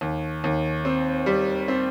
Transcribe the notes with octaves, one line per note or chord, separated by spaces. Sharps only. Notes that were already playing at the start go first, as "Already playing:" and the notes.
D#2
D#2
C4
G3
C4